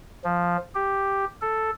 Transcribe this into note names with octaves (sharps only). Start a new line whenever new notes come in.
F3
G4
A4